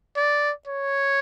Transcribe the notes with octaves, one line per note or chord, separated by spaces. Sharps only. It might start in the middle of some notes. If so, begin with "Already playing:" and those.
D5
C#5